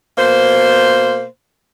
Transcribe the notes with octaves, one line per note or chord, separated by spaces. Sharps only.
B2 A#3 C5